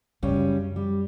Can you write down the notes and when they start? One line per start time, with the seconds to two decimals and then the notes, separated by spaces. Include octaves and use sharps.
0.23 F#2 C#3 G3 C#4
0.76 G3